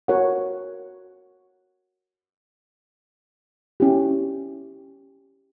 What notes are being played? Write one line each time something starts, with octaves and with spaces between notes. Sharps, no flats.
F#4 A#4 C#5 F#5
C#4 E4 G4